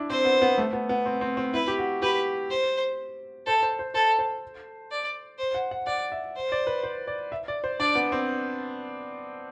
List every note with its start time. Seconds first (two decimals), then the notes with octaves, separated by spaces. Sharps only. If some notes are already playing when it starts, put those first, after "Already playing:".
Already playing: D4 E4
0.10 C4 C5
0.25 B3
0.42 B3
0.58 A3
0.73 B3
0.89 B3
1.06 C4
1.21 C4
1.37 C4
1.53 E4 B4
1.68 G4
1.78 F#4
2.02 G4 B4
2.51 C5
3.46 A4 C5
3.62 C5
3.79 C5
3.94 A4 C5
4.19 C5
4.91 D5
5.39 C5
5.55 F#5
5.71 F#5
5.87 D5 F#5
6.12 E5
6.36 C5
6.52 D5
6.67 B4
6.83 C5
7.07 D5
7.32 E5
7.48 D5
7.64 C5
7.80 D4 D5
7.95 B3
8.12 C4